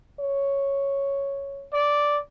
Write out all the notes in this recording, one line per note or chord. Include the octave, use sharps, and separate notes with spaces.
C#5
D5